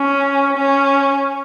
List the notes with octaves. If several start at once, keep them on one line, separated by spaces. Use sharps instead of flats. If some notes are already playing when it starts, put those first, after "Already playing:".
Already playing: C#4
C#4